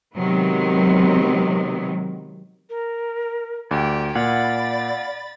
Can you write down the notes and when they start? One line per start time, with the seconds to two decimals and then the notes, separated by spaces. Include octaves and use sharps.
0.15 C3 D#3 F#3 G#3 B3
2.70 A#4
3.71 D2 G4 D5
4.15 A#2 D5 F5 F#5 G#5 B5 A6